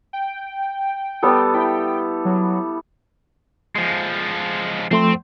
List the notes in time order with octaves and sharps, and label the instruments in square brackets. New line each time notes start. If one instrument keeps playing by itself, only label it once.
[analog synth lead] G5
[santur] G3 B3 A4
[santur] E4 [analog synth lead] G5
[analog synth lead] F#3
[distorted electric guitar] F3 G#3
[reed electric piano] F3 A3 C6 [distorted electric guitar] C4